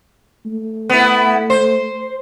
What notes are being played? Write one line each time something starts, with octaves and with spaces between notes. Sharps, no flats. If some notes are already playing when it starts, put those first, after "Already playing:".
A3
B3 E4
C5